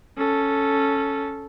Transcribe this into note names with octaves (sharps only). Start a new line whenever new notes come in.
C#4 A4